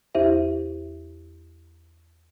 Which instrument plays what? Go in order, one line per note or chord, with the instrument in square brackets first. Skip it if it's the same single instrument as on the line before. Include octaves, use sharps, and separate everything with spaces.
[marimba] E2 E4 G4 C5 E5